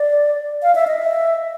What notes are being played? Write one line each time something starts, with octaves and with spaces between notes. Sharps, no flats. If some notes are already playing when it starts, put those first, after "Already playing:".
Already playing: D5
F5
E5
D#5
E5